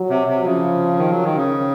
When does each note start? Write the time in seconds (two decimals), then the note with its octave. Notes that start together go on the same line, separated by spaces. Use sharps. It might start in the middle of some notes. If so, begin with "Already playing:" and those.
Already playing: F#3
0.10 C3
0.27 C3
0.45 C#3 F3
0.97 D#3
1.11 F#3
1.23 D#3
1.36 C#3